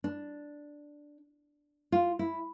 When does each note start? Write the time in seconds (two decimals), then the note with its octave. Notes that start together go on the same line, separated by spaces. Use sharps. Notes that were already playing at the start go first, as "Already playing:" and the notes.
0.04 D4
1.92 F4
2.19 E4